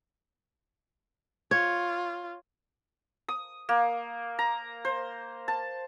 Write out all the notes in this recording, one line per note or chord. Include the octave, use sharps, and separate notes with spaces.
F4 C#5
D#6
A#3
A#5
C5
A5